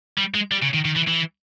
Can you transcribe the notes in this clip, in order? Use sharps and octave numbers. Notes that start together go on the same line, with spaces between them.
G3
G#3
G3
C#3
D#3
D#3
E3
E3